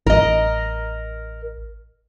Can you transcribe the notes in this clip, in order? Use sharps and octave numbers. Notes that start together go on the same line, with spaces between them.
A1 A#4 D#5